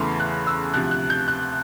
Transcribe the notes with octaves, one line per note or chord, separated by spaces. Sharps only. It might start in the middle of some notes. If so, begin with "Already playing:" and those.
Already playing: E2 C#3 E3 A3 B5 C6
F#6
E6
D2 C3 F3 F#6
F#6
G6
F#6